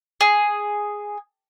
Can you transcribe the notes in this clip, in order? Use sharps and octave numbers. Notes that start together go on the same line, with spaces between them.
G#4